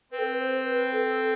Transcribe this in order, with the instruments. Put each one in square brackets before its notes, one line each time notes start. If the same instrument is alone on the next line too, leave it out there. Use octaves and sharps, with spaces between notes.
[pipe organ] C4 [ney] B4
[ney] A4
B4
C5
B4
A4